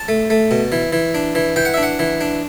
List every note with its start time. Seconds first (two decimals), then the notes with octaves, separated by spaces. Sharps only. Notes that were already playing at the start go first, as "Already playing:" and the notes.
Already playing: A5
0.08 A3
0.30 A3
0.51 B2
0.72 E3
0.93 E3
1.15 D4
1.35 E3
1.56 E3 G5
1.65 F#5
1.74 E5
1.78 D4
1.83 F#5
1.99 E3
2.21 D4